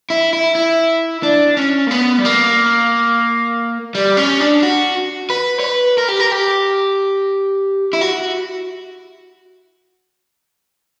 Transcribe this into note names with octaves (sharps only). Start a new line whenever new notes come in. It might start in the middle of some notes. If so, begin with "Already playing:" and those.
E4
E4
E4
D4
C#4
A#3
B3
G3
A#3
G3
C#4
D4
F#4
B4
C#5
B4
A#4
G4
A#4
G4
E4
F#4